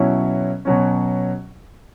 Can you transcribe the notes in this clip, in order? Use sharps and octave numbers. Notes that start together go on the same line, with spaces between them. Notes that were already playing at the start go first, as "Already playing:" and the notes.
Already playing: B2 F#3 C#4 E4
B2 F#3 C#4